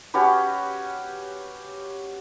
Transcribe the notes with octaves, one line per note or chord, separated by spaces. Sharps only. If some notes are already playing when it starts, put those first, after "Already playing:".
C#4 F#4 G4 B4